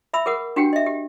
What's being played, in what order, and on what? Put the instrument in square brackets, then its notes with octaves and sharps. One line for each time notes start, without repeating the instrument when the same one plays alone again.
[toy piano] E5 B5 E6
G#4 A#4 F#5 D#6
D4 F#4 G4 F#5 G5
D#5 E5
G4